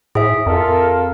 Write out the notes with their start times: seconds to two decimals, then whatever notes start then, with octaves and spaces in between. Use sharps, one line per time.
0.15 A2 G#4 E5
0.46 F2 F4 A4 A#4